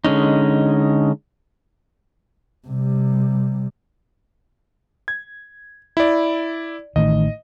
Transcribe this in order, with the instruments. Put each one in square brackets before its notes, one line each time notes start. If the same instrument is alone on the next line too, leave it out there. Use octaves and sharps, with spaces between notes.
[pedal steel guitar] D3 G#3 C#4 D#4
[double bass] C3 G3
[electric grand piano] G#6
E4 D5
[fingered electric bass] A1 A2 D#3 [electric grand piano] D#5